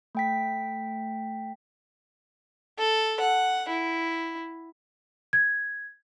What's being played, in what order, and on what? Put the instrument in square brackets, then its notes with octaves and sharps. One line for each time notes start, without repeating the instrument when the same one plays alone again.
[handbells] A3 G5 B6
[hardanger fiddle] A4
F#5
E4
[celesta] G#6